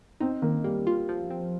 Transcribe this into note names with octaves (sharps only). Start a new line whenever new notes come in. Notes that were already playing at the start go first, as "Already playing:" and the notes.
C4 D#4
D#3 A#3
G3 A#3
F4
F3
C4